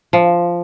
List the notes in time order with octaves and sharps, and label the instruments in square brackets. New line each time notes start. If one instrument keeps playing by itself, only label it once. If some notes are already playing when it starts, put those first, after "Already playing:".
[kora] F3